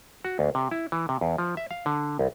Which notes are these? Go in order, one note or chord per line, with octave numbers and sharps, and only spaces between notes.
F#4
D2
C3
E4
E3
C3
E2
F3
E5
F5
D3
C2